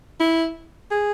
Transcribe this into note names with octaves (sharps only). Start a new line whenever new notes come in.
E4
G#4